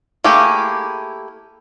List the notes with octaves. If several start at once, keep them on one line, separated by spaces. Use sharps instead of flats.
A3 A#3 E4 G4 G#4